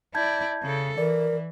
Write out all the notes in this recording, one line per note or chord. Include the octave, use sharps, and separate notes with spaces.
E4 D5 A5 G6 G#6
C#3 A4
E3 A#4 D5